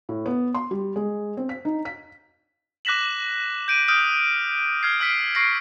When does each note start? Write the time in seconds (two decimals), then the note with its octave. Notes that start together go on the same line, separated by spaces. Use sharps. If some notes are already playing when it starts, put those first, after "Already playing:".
0.09 A2
0.26 B3
0.54 C6
0.71 G3
0.96 G#3
1.37 C4
1.49 B6
1.65 D#4
1.85 B6
2.85 D6 F#6 A#6 B6 E7 F#7
3.68 G6 D7 D#7
3.88 D#6 F6 G6 D7
4.83 F6 G#6 C7
5.00 E6 F6 B6 D7
5.35 C#6 A#6 C7 D7